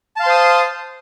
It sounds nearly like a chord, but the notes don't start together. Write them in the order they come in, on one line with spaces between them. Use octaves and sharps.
A5 F5 C6 C5 D#6